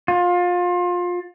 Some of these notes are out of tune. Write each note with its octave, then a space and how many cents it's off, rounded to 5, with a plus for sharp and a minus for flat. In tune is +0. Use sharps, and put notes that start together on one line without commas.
F4 +25